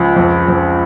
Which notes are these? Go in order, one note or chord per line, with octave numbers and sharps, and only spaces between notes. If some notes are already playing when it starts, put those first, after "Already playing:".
Already playing: C#2 F3
F2
F2